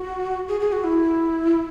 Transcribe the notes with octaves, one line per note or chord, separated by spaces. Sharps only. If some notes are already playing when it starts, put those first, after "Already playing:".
Already playing: F#4
G#4
G#4
F#4
E4